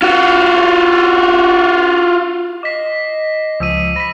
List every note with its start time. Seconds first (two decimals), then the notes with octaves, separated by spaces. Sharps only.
0.02 F4 F#4
2.63 D#5 D6 B6 C7
3.60 C#2 F3 D#6 E6 D#7
3.96 B5 A#6 B6